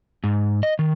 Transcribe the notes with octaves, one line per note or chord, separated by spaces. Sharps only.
G#2
D#5
D#3